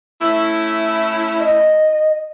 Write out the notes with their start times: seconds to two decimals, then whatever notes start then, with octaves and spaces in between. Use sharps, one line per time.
0.22 A3 C#4 E4
1.40 D#5